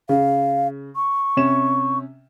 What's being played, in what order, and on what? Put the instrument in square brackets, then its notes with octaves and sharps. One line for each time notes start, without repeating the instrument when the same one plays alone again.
[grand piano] C#3 [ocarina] F5
[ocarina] C#6
[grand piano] C3 C#4 E7